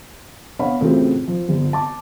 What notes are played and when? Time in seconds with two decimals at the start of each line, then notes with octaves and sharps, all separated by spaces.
0.59 B3 D4 C#5 F5 F#5 B5
0.81 A2 C#3 E3 C4 F4 F#4
1.28 F3
1.48 G1 F3 B3
1.73 A5 D6